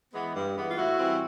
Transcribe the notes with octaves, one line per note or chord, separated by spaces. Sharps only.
E3 G#3 B3
G2
E3 G#3 B3
F4
A2 E4 F#4
E3 G3 C4